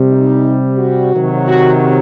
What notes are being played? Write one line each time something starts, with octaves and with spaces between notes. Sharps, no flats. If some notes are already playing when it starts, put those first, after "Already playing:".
Already playing: C3 G3
D#4
F#4
C3 D#3 F#3
F#4